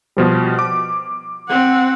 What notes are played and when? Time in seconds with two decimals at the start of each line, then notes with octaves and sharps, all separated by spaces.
0.17 B2 F3 G3
0.59 D6
1.49 C4 F#5